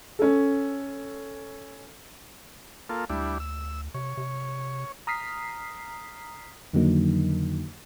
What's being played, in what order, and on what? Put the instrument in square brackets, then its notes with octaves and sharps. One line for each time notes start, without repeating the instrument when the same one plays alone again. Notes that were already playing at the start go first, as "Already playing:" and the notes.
[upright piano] C#4 A4
[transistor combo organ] A#3 F4 A4
[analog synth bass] D2 [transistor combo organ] G3 D4 E4
[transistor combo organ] E6
[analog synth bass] C3 [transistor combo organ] C#5
[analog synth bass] C3
[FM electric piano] A#5 D#6 F6 B6 C7
F2 D3 D#3 F#3 A#3 D#4